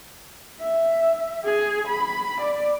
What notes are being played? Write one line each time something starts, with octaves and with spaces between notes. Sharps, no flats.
E5
G#4
B5
D5